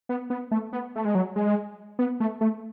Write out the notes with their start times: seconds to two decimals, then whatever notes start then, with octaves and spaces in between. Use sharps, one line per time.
0.09 B3
0.30 B3
0.51 A3
0.73 B3
0.96 A3
1.05 G#3
1.15 F#3
1.36 G#3
1.99 B3
2.20 A3
2.41 A3